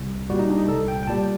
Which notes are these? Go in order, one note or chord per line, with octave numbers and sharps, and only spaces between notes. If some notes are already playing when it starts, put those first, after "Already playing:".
Already playing: C2
A#2 G3 F#4
D#4
D4
D#4
C2 A4
G5
G5
A#2 G3 A5